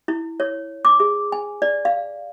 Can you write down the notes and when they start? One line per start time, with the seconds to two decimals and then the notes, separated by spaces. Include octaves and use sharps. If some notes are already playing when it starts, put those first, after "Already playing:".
0.08 E4
0.40 C#5
0.85 D6
1.00 G#4
1.32 G#5
1.62 D5
1.85 F5